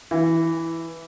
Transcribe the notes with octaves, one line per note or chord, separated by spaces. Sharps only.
E3